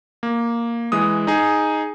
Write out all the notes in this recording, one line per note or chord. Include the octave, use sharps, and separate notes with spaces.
A#3
E3 G#3 D#6
D#4 G#4